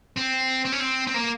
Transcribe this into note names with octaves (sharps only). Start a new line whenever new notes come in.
C4
C4
C#4
C4
C4
A#3